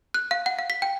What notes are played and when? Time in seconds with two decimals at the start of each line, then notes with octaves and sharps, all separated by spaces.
0.14 F#6
0.31 F5
0.46 F#5
0.59 F5
0.70 B6
0.82 G5